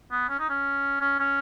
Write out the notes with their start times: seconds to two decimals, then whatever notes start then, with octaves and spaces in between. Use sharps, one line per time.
0.12 B3
0.29 C#4
0.39 D#4
0.50 C#4
1.01 C#4
1.19 C#4